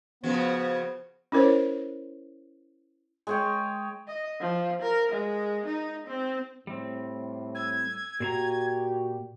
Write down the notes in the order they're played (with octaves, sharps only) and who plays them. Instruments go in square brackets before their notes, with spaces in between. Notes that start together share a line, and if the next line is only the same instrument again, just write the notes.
[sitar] C#3 F3 F#4 [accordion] B3 [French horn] C5
[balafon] C#4 E4 A#4 C5 C#5
[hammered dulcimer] G#3 C#5 G5
[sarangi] D#5
F3
A#4
G#3
D#4
C4
[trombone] A2 [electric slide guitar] G3 C4
[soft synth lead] E6 [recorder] G#6
[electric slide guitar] A#2 C5 A#5 [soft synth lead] F#4 [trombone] G4